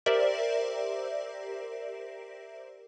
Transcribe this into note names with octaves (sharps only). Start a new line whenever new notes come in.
G4 A#4 C5 D5 E5